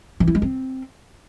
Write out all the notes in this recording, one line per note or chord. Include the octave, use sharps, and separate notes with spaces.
E3
E4
G#3
C4